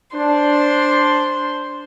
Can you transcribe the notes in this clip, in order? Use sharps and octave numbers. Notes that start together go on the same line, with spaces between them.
D4 C5